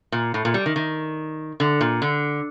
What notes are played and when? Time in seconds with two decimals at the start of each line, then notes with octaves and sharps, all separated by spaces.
0.12 A#2
0.34 A2
0.45 A#2
0.54 G3
0.66 D#3
0.76 D#3
1.60 D3
1.81 A#2
2.02 D3